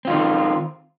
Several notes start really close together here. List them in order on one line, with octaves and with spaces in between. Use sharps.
C4 F4 D#3